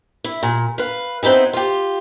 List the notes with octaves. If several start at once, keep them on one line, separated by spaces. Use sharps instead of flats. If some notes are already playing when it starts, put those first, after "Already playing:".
E4
A#2
B4 F5
B3 C4 D#4 E4 G#4
F4 G4